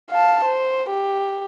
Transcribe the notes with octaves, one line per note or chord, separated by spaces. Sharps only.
F5 A5
C5
G4